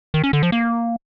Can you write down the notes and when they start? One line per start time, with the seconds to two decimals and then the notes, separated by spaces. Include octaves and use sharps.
0.14 D#3
0.24 C#4
0.33 D3
0.43 F3
0.52 A#3